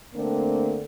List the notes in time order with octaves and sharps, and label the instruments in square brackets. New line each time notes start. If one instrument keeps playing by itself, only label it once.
[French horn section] D3 A3 A#3 C4 D4